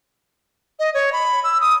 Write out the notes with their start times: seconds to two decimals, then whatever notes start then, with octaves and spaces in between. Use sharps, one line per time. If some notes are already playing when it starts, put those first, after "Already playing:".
0.79 D#5
0.94 C#5
1.13 B5
1.44 E6
1.61 D#6